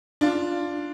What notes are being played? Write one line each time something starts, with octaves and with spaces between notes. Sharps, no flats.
D4 F4